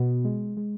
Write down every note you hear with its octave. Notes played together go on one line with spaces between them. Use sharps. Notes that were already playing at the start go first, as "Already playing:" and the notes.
Already playing: B2 B3
G#3
G#3